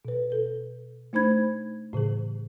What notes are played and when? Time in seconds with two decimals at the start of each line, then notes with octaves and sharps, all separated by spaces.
0.05 B2 B4
0.30 A4 B4
1.13 A3 D4 D#4 C5 B5 G#6
1.93 A2 C#3 E3 G#4